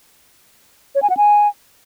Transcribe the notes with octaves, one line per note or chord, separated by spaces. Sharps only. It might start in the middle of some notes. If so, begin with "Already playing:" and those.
C#5
G#5
F#5
G#5